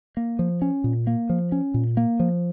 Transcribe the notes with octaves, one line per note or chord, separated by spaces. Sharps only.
A#3
F3
C#4
A#2
A#3
F3
C#4
A#2
A#3
F3